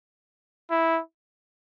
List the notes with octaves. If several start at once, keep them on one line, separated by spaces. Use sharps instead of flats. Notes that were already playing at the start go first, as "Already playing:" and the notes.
E4